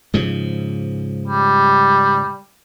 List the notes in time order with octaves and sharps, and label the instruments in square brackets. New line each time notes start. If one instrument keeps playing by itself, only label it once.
[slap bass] G#2 C#3 F3
[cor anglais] G3